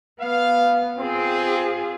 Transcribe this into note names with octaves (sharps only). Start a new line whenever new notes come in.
B3 F5
C4 F4 G#4